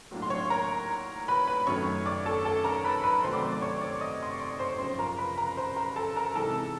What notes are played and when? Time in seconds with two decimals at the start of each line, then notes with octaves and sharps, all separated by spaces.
0.11 A2 F#3 A#3 D4
0.22 C6
0.30 C#5 C#6
0.50 A#4 A#5
1.28 B4 B5
1.48 B4 B5
1.67 F#2 D#3 F#3 A3 C#5 C#6
2.06 D5 D6
2.26 A4 A5
2.45 A4 A5
2.64 A#4 A#5
2.84 B4 B5
3.03 B4 B5
3.23 C3 D#3 F#3 A3 C5 C6
3.33 D5 D6
3.52 D5 D6
3.62 C#5 C#6
3.81 D5 D6
4.01 D#5 D#6
4.23 C6
4.31 C#6
4.40 D5 D6
4.59 C5 C6
4.79 F#2 C#3 F3 C5 C6
4.99 A#4 A#5
5.18 B4 B5
5.38 A#4 A#5
5.57 C5 C6
5.76 A#4 A#5
5.96 A4 A5
6.16 A#4 A#5
6.35 C3 E3 G#3 A4 A5